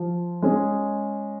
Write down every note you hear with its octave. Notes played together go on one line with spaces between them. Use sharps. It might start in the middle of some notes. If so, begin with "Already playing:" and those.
Already playing: F3
G#3 C#4 G#4